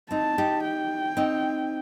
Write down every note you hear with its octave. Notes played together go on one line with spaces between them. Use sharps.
C4 D#4 A5
D#4 G4
G5
C4 D#4